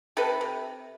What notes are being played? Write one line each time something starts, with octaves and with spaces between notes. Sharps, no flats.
C3 A4 B4
C3